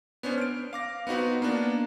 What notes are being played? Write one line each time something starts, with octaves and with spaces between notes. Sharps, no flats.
B3 C#4 D4 C5
F6 D7
F5 D6 A#6
B3 C4 D#4 F#4 B4
A#3 B3 D4